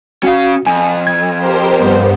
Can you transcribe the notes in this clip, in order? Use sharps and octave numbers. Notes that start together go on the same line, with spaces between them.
C#4 F#4 F5
F2 G#5
G#6
G4 A#4 C5
G2 B3